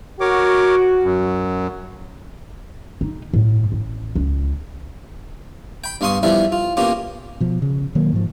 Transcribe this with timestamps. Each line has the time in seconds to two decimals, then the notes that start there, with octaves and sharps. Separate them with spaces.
0.21 F#4 A#4 C#5 D6
1.03 F#2
3.01 D#4
3.34 A2
3.72 A1
4.15 C#2
5.84 G5 B5
6.01 G2 B3 F5 C6 C#6 D#6
6.23 F3 G3 B3 E4 E5 F5
6.52 F4
6.77 A#3 B3 C#4 F4 G4
7.40 B2 F3
7.62 C#3
7.95 B2 D#3 F#3 A#3
8.13 G#2 F3